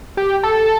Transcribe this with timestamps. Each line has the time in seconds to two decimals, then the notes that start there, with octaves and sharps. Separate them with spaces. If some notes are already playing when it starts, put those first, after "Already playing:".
0.17 G4
0.43 A4